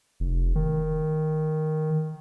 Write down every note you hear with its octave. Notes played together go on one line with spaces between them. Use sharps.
F1
D#3